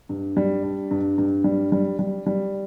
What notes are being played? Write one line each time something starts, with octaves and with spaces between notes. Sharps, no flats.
G2
G3
D4
G2
G2
G3
G3
G3
G3